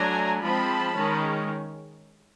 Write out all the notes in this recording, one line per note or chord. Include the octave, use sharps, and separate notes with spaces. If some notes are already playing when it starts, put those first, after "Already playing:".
Already playing: F#3 A3 D4 G#5 A#5
F3 G#3 C4 A5 B5
D#3 G#3 C#4